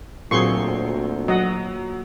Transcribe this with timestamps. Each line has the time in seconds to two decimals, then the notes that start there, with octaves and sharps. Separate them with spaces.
0.31 D2 A#2 F#3 C4 G#4 C6 C#6 C7
1.28 F#3 D#5 F#5